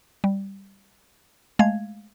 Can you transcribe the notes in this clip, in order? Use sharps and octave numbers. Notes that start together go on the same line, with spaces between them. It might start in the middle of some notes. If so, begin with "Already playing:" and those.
G3
G#3 A3 F5 G#6